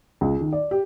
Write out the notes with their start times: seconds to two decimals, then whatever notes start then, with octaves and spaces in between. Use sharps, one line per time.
0.21 C#2
0.41 D#3
0.53 D5
0.71 G4